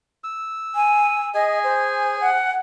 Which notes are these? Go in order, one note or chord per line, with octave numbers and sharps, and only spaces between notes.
E6
G#5
G#4 D#5 G#5
C5
F#5